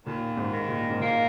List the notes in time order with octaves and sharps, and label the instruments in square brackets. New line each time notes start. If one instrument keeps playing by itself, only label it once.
[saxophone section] D#2 [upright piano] A#2
[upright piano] G#2
[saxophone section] D#3
[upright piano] A#2
G#2
[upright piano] A#2 [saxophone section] A#3